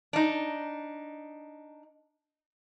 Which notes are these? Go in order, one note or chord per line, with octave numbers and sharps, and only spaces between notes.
D4 D#4